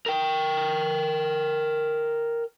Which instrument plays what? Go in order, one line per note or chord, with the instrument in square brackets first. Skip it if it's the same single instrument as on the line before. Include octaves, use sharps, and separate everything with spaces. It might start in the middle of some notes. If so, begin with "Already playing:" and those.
[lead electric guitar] A#4 G5